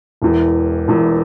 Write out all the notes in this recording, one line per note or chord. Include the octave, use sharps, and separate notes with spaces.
E1 E2 E3
E1 E2 E3